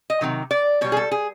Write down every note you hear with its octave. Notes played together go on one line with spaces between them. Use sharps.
D#5
C3 D#3 F#3
D5
B2 G3 C#5
G#4
A4
G#4